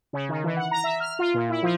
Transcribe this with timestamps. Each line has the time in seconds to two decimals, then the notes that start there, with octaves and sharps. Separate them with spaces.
0.13 C#3
0.29 D#3
0.44 E3
0.56 F#5
0.71 A#5
0.84 E5
1.00 F6
1.19 F4
1.34 A#2
1.49 E4
1.63 F3